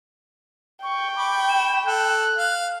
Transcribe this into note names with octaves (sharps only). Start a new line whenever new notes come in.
G5 C#6
B5 C#6 D6
E7
A4 F#6
F5